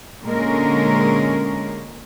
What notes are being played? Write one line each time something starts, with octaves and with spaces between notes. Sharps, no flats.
A#2 D3 G#3 C#4 A#4